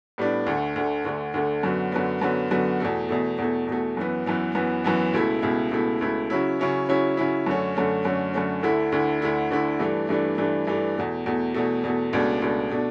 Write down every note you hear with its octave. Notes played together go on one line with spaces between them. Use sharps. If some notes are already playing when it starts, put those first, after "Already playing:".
A2 G3 B3 D4
D2 D3 A3
D2 D3 A3
D2 D3 A3
D2 D3 A3
F#2 D3 F#3 B3
F#2 D3 F#3 B3
F#2 D3 F#3 B3
F#2 D3 F#3 B3
E2 B2 A3
E2 B2 A3
E2 B2 A3
E2 B2 A3
F#2 E3 B3
F#2 E3 B3
F#2 E3 B3
F#2 E3 B3
C#2 B2 A3 E4
C#2 B2 A3 E4
C#2 B2 A3 E4
C#2 B2 A3 E4
C#3 F#3 C#4 E4
C#3 F#3 C#4 E4
C#3 F#3 C#4 E4
C#3 F#3 C#4 E4
F#2 D3 A3 C#4
F#2 D3 A3 C#4
F#2 D3 A3 C#4
F#2 D3 A3 C#4
D2 D3 A3 E4
D2 D3 A3 E4
D2 D3 A3 E4
D2 D3 A3 E4
G2 E3 A3 D4
G2 E3 A3 D4
G2 E3 A3 D4
G2 E3 A3 D4
E2 B2 A3
E2 B2 A3
E2 B2 A3
E2 B2 A3
C#2 B2 A3 D4
C#2 B2 A3 D4
B2 A3 D4